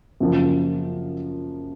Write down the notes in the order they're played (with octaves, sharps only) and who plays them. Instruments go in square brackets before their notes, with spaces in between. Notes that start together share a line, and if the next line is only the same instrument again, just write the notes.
[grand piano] F#2 C#3 F3 A#3